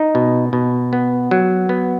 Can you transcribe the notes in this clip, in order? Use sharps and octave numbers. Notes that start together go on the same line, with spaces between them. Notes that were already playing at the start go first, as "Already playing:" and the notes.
Already playing: D#4
B2
B2
B3
F#3
B3